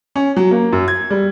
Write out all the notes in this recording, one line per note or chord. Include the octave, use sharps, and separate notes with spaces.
C#4
F#3
A#3
F#2
G#6
G3